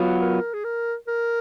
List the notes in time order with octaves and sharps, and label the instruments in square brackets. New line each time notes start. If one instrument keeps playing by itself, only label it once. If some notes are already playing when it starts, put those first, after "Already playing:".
Already playing: [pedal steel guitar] F#3 B3 F4
[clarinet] A#4
G#4
A#4
A#4